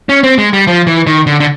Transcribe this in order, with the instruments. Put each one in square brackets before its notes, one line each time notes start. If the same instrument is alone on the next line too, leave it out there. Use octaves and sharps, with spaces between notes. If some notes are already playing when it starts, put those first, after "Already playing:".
[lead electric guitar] C#4
C4
G#3
G3
F3
E3
D#3
D3
D3